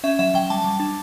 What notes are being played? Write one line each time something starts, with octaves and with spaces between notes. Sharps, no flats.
C#4 E5
F#3 E5
F#3 G5
G3 A5
G3
D4